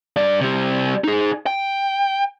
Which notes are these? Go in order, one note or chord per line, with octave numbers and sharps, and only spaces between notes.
G2 D5
C3 G3
D#4 G#4
G5